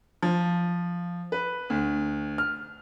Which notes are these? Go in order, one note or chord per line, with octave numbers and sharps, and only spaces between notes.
F3
B4
D2
F6